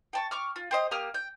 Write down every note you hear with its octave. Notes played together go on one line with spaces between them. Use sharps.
G5 A5 C#6
C#6 D6 F6
F4
G4 C5 D#5
A#3 G4 D#6 F6
G5